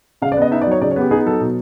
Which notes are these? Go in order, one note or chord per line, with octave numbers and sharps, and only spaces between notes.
C#3 F5
D5
B3 D#5
D#4 E5
D5
F#3 C#5
C#3 D5
C#5
B3
G4
D#4 G#4
F#3 A4
B2